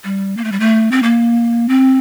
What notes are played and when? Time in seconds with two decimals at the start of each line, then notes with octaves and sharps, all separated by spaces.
0.04 G3
0.37 A#3
0.44 A3
0.52 G3
0.60 A3
0.92 C4
1.03 A#3
1.69 C4